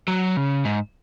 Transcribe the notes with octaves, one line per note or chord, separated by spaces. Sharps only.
F#3
C#3
G#2